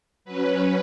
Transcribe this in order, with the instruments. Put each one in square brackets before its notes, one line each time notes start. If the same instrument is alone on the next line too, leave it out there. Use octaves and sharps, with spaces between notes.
[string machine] F#3 C#4 B4